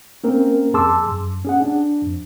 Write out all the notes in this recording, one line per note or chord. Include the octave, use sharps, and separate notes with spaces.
A#3 C4 C#4 A#4
F2 G#4 A5 C6 D6 E6
F#2
C#4 G#4 F#5
D4
F2